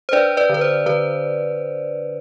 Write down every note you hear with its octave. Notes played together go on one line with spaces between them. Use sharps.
C5
D4 B4 D5
B4 D5
D3 B4
C5
D3 B4